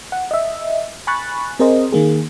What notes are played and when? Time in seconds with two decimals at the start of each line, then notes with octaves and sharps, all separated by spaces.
0.12 F#5
0.31 D#5 E5
1.07 G#5 B5 C#6 F#6 A6
1.59 C4 G#4 A#4 C5 D#5
1.92 D#3 A#3 G#4